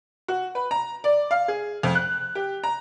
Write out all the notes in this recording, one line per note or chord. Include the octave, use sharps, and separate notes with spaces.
F#4
B4
A#5
D5
F5
G#4
F2
F#6
G4
A#5